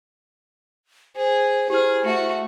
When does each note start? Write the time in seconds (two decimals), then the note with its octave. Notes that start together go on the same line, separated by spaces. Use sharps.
1.16 G#4 C5
1.70 E4 G4 G#4 C5 F6
2.05 A3 F#4